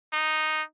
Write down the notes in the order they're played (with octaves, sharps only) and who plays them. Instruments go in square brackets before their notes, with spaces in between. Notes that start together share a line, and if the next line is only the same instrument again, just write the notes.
[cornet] D#4